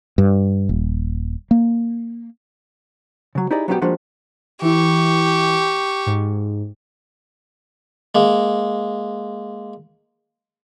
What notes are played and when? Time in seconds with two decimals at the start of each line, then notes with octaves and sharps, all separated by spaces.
0.18 G2
0.69 D#1
1.51 A#3
3.35 C#3 F#3
3.51 D#4 E4 G4 G#4 D5 D#5
3.68 F#3 G3 B3 C#4 D4 G4
3.82 F3 G3 G#3 A#3 D4 F#4
4.62 E3 E4 G4 C#6
6.07 G#2
8.15 G#3 A#3